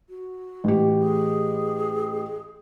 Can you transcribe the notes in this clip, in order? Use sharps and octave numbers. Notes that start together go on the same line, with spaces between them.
F#4
A1 G4
G#4